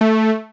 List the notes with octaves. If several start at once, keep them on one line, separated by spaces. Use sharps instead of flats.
A3